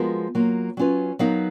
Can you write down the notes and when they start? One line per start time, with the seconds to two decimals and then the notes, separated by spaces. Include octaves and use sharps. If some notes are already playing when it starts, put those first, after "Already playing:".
Already playing: F3 G#3 B3 F#4 A#4
0.35 F#3 A#3 F4
0.77 F#3 C#4 F4 B4
1.19 F#3 B3 D#4 A#4 F5